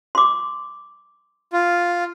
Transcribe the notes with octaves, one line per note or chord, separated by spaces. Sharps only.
C6 D6
F4